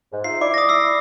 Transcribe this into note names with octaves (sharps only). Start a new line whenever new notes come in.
G#2
D#4 F4 E5 C7
E4 D5 D6
D#6 A#6
E6 C7